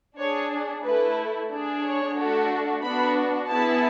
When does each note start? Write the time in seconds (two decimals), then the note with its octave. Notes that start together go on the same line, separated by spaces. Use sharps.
0.18 D4 G#4 C#5
0.85 A3 E4 A4 B4
1.51 D4 G#4
1.83 C#5
2.16 A3 D4 F#4 A4
2.82 B3 D4 F#4 B5
3.48 B3 E4 G#4 A5